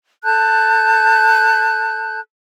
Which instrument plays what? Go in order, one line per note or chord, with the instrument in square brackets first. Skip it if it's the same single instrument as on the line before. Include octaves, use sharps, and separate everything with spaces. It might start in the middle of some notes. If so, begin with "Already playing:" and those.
[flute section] A4 A5 F#6 G6